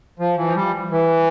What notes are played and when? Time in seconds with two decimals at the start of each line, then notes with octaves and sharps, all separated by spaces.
0.19 F3
0.37 E3
0.47 F3
0.56 G3
0.91 E3